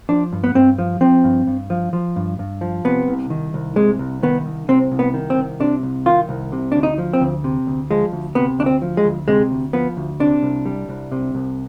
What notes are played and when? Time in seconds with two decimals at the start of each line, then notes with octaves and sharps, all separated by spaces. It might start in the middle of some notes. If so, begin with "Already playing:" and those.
0.09 F3 D4
0.32 G2
0.44 B3
0.55 G2 C4
0.78 F3
1.01 F3 C4
1.24 G2
1.47 G2
1.70 F3
1.93 F3
2.16 G2
2.39 G2
2.61 F3
2.85 C3 B3
3.08 C2
3.30 D#3
3.54 C2
3.76 C3 G#3
3.99 C2
4.23 D#3 B3
4.46 C2
4.69 C3 C4
4.92 C2
4.99 B3
5.14 D#3
5.30 C4
5.38 C2
5.60 C3 D4
5.83 C2
6.06 D#3 F4
6.29 C2
6.52 C3
6.72 D2 D4
6.83 D#4
6.98 F3
7.13 C4
7.21 D2
7.44 C3
7.67 D2
7.90 F3 G#3
8.12 D2
8.35 C3 B3
8.59 D2 D4
8.66 C4
8.82 F3
8.97 G#3
9.05 D2
9.28 C3 G#3
9.51 D2
9.73 F3 B3
9.97 D2
10.20 C3 D4
10.43 C2
10.65 G3
10.89 C2
11.12 C3
11.35 C2